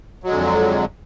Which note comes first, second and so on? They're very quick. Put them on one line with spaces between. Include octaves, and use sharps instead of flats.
F#3 G#3 D3 F2